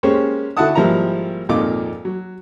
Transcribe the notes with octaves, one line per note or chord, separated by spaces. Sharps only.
G#3 A#3 C#4 G4 C5 C#5
D3 E4 F#4 F#5 A5 D#6
G#1 F3 G3 A#3 E4 A#5
G#1 F2 A#2 D#4 F4 D6
F#3